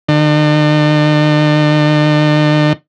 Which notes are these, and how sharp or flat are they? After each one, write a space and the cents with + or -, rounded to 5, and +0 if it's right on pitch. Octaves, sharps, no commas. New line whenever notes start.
D3 +45